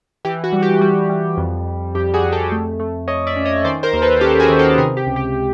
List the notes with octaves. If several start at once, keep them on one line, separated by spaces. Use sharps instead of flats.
E3 G4
F#4
G3
G4
G3 F#4
G3
F2
F2
F2 G4
F#4 G#4
F2
G4 A4
A3
A3
A3 C#5 D#5
D5 E5
C#4
C#5 D#5
D#3 C5 D5
A#4 C5
D#2
A4 B4
C#4 G4 A4
F#4 G#4
D#3
G4 A4
C3 G#4 A#4
G4
C#2
G4